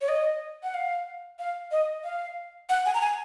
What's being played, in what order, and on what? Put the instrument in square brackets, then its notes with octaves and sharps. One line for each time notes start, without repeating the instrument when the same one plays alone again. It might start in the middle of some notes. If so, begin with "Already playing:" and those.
[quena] C#5
D#5
F#5
F5
F5
D#5
F5
F#5
G#5
A#5
G#5